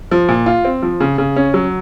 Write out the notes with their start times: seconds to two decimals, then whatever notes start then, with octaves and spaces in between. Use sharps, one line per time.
0.11 F3
0.28 A#2
0.46 F4
0.65 C4
0.82 F3
1.00 C#3
1.18 C#3
1.36 C#4
1.54 F#3